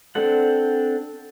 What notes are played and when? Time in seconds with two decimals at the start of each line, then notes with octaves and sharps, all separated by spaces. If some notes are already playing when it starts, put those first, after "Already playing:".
0.15 C4 D4 A4 F#5